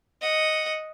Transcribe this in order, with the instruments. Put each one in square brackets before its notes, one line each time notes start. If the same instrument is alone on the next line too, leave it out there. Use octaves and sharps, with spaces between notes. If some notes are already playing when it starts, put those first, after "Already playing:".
[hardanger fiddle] D#5 F#5